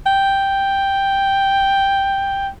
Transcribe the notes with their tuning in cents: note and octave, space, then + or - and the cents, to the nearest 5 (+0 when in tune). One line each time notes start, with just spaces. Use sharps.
G5 +5